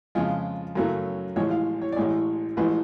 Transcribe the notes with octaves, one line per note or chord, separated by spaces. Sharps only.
F2 C#3 G#3 F4
F#2 C#3 F#3 A3
A1 A2 F3 G#3 C#5
F5
C#5
D5
A1 A2 G#3 C#5
A1 A2 F3 G#3 B4